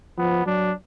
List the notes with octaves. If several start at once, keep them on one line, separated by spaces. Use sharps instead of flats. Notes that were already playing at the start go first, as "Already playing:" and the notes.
F3 B3
F#3 D4